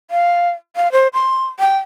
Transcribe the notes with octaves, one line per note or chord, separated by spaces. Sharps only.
F5
F5
C5
C6
G5